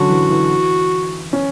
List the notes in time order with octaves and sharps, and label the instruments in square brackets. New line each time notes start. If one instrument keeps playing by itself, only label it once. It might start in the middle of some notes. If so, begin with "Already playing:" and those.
Already playing: [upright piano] D3 F#3 C#4 [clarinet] F#4
[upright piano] E3
E3
C#4